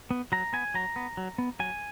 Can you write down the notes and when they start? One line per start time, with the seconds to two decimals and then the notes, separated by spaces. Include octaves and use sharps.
0.11 B3
0.32 F#3 A#5
0.53 B3 G#5
0.74 F#3 A#5
0.96 B3
1.17 F#3
1.38 B3
1.60 F#3 G#5